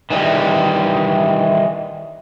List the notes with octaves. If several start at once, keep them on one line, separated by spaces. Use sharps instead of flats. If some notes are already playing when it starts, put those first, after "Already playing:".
D#3 E3 G3